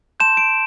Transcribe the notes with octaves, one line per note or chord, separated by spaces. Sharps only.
A5 C6 G6 E7
D7